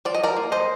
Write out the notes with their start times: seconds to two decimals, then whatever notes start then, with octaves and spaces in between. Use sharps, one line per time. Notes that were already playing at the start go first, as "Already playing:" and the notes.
0.05 F3 D5
0.14 D#5
0.23 A#4 D5
0.37 A#3
0.52 C5 D#5